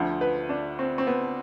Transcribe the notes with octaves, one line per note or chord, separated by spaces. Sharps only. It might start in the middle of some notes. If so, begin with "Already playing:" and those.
Already playing: D2 D3 F3
B4
D4
C4
C4
B3